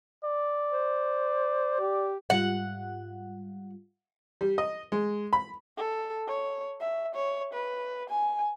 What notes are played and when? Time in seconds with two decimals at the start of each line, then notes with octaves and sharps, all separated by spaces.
0.24 D5
0.70 C5
1.80 G4
2.30 G#2 G3 F4 F#5
4.41 G3
4.58 D#5
4.92 G#3
5.33 B5
5.78 A4
6.28 C#5
6.80 E5
7.15 C#5
7.53 B4
8.09 G#5